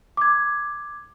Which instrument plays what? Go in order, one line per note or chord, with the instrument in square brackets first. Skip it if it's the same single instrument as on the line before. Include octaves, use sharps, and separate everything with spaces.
[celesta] D6 G#6